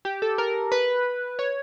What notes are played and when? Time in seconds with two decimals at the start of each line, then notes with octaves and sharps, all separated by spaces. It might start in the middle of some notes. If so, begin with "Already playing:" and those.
0.05 G4
0.22 A4
0.38 A#4
0.72 B4
1.39 C#5